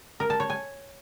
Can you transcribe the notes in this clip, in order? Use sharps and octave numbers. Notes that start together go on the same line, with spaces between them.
A#4
A5
C#5
G#5